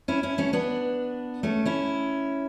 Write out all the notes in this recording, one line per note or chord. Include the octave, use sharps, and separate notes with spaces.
C#4 E4
C#4 E4
A3 C#4
B3 D4
A3 C#4
C#4 E4